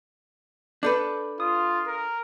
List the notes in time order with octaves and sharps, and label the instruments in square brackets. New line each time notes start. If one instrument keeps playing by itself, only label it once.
[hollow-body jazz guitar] D4 A4 B4 [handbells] D6 G6
[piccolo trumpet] F4 [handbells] D#6
[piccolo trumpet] A#4